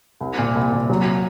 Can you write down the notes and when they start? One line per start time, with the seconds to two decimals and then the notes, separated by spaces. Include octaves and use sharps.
0.21 C2
0.38 A#2
0.55 C2
0.72 A#2
0.90 F#3